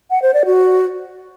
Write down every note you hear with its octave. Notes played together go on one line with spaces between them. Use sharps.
F#5
C5
D5
F#4